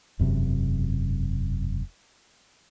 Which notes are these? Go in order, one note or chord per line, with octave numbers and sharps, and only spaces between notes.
E1 F#2 C3